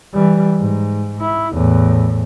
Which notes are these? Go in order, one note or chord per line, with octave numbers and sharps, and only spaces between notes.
E3 G3
G#2
E4
E2 A2